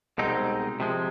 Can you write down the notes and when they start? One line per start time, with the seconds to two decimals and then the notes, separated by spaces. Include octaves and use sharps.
0.18 C2 B2 G#3 C4 D#4
0.80 C3 F3 G#3